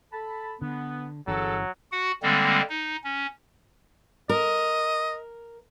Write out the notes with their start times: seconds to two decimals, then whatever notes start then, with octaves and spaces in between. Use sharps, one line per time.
0.13 A4 A5 B5
0.62 D3 B3
1.28 G1 E3 F#3 C#4 G#4 A4
1.92 F#4 F#5
2.22 D3 G3 G#3 A#3 C4
2.69 D#4
3.04 C#4
4.29 A#4 D#5